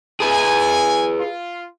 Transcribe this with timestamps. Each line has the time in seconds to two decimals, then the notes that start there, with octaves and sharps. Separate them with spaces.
0.20 G#4 B4 G#5
1.18 F4